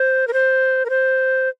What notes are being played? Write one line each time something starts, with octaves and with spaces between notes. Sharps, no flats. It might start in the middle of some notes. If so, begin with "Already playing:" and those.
Already playing: C5
A#4
C5
A#4
C5